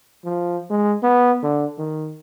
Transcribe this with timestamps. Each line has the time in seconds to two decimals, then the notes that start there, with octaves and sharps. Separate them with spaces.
0.25 F3
0.70 G#3
1.03 B3
1.43 D3
1.78 D#3